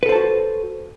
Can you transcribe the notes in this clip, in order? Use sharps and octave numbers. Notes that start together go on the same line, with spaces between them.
F#4 A4 B4 C5 A5